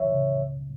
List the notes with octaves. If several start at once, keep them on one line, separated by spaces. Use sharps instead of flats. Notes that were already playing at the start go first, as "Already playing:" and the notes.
Already playing: C#2 E3 C#5 E5
C#3
C#2